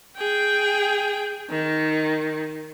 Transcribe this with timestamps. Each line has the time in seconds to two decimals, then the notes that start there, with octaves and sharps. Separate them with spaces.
0.17 G#4 G5
1.50 D#3